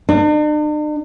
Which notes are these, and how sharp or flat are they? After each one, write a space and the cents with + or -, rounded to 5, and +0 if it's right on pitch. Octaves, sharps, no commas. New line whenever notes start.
D4 +45